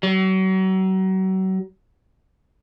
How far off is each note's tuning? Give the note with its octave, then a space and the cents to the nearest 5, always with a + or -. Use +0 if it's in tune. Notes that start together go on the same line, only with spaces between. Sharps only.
F#3 +35